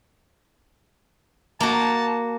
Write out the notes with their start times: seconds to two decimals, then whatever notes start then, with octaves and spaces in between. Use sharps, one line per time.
1.60 A#3 F#4 A5